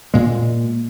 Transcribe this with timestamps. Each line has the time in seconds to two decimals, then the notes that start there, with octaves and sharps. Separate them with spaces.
0.14 A#2 G#3